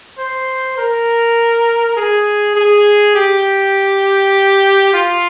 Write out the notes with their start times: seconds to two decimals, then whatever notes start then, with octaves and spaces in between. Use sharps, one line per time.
0.18 C5
0.78 A#4
1.97 G#4
2.56 G#4
3.15 G4
4.94 F4